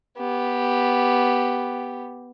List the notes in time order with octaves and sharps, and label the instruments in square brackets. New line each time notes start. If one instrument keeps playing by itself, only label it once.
[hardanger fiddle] B3 G4